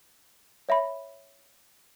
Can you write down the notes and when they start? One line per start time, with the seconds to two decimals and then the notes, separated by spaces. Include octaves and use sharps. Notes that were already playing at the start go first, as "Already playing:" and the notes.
0.69 C#5 E5 B5